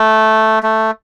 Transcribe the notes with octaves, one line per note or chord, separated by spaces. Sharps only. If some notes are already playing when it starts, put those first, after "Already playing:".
Already playing: A3
A3